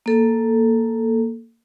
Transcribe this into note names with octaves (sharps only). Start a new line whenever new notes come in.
A#3 A4